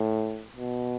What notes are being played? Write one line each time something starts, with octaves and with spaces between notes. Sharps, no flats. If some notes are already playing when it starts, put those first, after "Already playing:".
Already playing: A2
B2